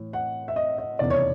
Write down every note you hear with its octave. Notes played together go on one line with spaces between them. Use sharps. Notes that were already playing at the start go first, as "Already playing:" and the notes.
Already playing: A2 E3
F#5
E5
D#5
D#5
F1 E2 C#3 D5
C#5